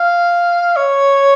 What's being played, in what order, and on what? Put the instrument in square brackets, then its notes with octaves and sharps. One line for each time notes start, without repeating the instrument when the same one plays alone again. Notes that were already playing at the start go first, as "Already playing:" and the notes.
Already playing: [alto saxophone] F5
C#5